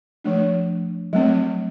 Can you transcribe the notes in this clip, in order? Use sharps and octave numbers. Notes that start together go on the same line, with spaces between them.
F3 A3 D4
F#3 A3 C4